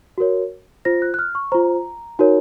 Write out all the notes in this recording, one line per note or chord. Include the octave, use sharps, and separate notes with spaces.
F#4 A#4 C#5
F4 C5 A#6
F#6
F#6
F6
C#6
F4 C5 A#5
D#4 F#4 A#4 C#5